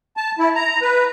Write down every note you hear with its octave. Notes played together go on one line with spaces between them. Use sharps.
A5
E4
A#5
B4